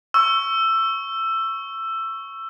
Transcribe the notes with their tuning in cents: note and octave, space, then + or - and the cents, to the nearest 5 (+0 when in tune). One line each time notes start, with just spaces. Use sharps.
C#6 +0 E6 +15